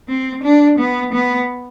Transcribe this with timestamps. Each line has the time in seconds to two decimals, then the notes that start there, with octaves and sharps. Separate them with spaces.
0.09 C4
0.43 D4
0.79 B3
1.13 B3